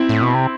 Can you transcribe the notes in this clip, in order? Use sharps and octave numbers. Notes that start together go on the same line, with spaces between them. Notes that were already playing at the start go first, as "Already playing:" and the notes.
Already playing: C4 E4
A2
B2
C3